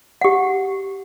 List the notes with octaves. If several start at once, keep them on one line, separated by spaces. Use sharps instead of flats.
G4 F#5